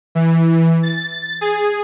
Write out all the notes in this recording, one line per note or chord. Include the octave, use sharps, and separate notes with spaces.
E3
A6
G#4